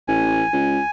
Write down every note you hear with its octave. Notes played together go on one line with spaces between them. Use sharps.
A1 G#5
C#2